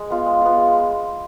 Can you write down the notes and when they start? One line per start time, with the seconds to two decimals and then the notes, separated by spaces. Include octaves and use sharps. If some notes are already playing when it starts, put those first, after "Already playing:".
Already playing: G#3
0.10 B3 F4
0.26 G#3
0.42 B3 F4
0.57 G#3